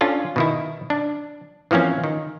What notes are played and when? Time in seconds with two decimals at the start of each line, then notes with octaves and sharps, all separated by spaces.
0.01 C#4 D4 F4 A4
0.36 B2 D#3 E4
0.90 D4
1.71 E3 F3 A#3 C4 C#4
2.04 D#3